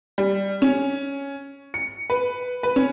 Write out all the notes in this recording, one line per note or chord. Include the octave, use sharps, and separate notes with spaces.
G3
C#4
C#7
B4
B4
C#4